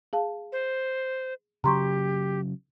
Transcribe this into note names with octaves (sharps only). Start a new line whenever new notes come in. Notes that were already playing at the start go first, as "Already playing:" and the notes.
G#4 F5 A5
C5
C#3 F#3 G4 A#5 C6 C#6